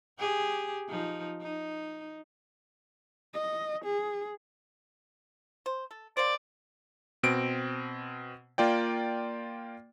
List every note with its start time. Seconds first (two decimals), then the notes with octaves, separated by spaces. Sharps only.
0.19 G4 G#4
0.89 F3 D#4
1.41 D#4
3.34 D#5
3.85 G#4
5.66 C5
5.91 A4
6.17 A#3 C4 C5 D5
7.23 B2 C4 D7
8.58 A#3 F4 D5 G5